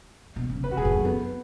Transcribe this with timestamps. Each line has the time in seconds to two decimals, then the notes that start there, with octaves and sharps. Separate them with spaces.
0.36 B2
0.50 C#3
0.63 C#3 B4
0.71 F#4
0.77 A2 G#4
0.85 G#2
0.91 F#2 A3
1.05 F#2 B3